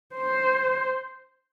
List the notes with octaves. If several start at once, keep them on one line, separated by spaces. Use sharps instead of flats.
C5